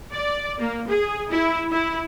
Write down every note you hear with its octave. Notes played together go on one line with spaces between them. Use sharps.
D5
A#3
G#4
E4
E4